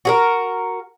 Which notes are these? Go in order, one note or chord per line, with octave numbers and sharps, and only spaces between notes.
F#4 G#4 A#4